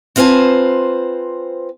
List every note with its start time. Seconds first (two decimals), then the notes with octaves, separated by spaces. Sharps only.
0.16 C4 F4 B4 C5 G#5 A5